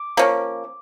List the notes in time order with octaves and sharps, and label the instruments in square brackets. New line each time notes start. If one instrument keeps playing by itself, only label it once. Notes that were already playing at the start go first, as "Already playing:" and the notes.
Already playing: [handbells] D6
[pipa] F3 A#3 C#4